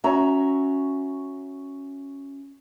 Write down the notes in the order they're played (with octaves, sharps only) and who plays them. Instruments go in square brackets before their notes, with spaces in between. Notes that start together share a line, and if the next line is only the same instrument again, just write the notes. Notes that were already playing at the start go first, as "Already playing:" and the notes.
[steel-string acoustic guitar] C#4 F#4 E5 A#5